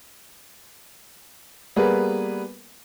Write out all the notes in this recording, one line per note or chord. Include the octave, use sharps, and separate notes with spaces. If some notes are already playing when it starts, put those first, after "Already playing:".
G3 A#3 B3 G#4 A#4 B4